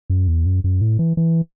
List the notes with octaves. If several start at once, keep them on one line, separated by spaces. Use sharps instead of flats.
F#2
E2
F#2
F#2
A2
E3
E3